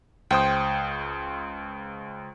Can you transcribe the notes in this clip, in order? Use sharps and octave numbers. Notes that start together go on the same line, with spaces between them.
C#2 C5 G5 D#6